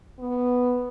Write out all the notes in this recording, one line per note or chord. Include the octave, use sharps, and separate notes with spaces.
B3